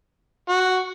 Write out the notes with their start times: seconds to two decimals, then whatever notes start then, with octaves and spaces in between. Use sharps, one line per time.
0.49 F#4